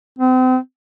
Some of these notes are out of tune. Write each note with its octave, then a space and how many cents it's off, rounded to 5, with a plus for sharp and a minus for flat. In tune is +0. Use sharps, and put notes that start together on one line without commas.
C4 -35